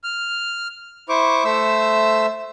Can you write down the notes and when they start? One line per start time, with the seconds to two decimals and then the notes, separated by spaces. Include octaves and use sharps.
0.04 F6
1.09 E4 C5 C#6 D6
1.45 A3 C5 E5 E6